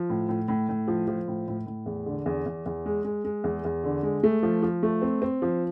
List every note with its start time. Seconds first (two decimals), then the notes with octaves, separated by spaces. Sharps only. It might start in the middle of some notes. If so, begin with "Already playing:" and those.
Already playing: F3
0.10 A2
0.29 A2
0.48 A2
0.69 A2
0.88 F3
1.08 F3
1.28 A2
1.48 A2
1.66 A2
1.86 E2
2.06 D3
2.26 E2
2.46 E2
2.66 E2
2.86 G#3
3.04 G#3
3.24 G#3
3.44 E2
3.65 E2
3.84 D3
4.03 G#3
4.23 A3
4.43 F3
4.62 F3
4.83 A3
5.02 C4
5.22 C4
5.42 F3